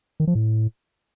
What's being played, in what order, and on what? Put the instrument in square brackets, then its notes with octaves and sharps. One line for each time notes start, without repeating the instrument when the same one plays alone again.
[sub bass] D#3
F3
A2